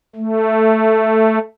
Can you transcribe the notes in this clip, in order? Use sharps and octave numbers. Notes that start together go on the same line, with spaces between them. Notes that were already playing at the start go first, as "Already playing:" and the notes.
A3